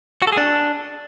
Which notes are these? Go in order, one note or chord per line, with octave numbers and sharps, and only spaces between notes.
F#4
A4
G#4
D4